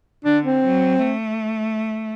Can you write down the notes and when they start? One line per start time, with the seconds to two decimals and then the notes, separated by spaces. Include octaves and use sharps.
0.25 D3 D4
0.44 C4
0.64 F#3
1.04 A3